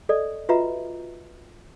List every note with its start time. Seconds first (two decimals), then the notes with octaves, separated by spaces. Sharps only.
0.09 A4 D5 D#5
0.49 F4 F#4 B4 D#5 E5 A#5